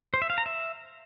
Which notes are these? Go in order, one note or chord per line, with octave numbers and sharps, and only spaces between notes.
C5
E5
F5
A#5
E5